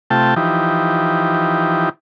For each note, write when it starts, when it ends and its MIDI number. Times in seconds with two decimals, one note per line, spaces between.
0.10 0.34 48
0.10 0.34 57
0.10 0.34 65
0.10 0.34 79
0.10 0.34 81
0.36 1.89 52
0.36 1.89 53
0.36 1.89 63
0.36 1.89 67